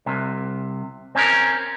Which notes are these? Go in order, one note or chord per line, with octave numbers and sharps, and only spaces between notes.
C2 C3
C4 C#4 A#4